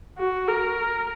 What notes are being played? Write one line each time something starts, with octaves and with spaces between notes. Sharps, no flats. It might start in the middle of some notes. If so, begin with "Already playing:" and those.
F#4
A#4